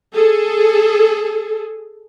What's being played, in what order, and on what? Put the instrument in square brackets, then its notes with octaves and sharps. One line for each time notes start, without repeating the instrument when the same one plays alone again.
[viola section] G#4 A4